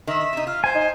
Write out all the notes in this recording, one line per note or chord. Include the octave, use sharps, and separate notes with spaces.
D#3 E5
C3 D#4
F4 F6
C5 G#5
D#4